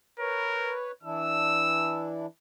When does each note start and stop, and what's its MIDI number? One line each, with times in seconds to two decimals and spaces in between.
0.20 0.75 70
0.20 0.91 71
0.20 0.91 73
1.03 2.26 52
1.03 2.26 62
1.03 2.26 64
1.03 2.10 88